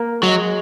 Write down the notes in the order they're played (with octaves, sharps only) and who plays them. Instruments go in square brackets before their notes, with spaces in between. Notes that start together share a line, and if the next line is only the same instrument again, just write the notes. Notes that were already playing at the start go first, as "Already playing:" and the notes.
Already playing: [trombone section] A#3
[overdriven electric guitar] F#3 [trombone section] G#3